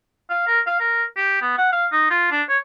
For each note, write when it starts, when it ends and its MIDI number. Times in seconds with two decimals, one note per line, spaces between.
0.30 0.46 77
0.47 0.60 70
0.67 0.77 77
0.80 1.04 70
1.17 1.41 67
1.42 1.54 59
1.58 1.70 78
1.73 1.86 77
1.92 2.06 63
2.10 2.30 65
2.31 2.42 62
2.49 2.58 73